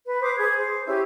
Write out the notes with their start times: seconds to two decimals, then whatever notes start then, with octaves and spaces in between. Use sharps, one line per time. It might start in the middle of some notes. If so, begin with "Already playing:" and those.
0.05 B4
0.22 B4 C5 D6 D#6
0.37 G#4 G#6
0.57 C5
0.87 C#4 E4 G4